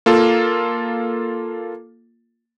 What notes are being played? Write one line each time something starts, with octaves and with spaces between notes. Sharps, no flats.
A#3 F4 A4